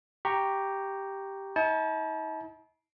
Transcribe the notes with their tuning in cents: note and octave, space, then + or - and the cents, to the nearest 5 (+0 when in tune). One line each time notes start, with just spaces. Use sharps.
G4 +0 A#5 +0 C#6 +0
D#4 +45 A5 -30